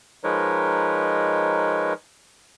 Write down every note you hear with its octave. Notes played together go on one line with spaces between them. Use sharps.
F3 G#3 D#4 A#4 B4 C#5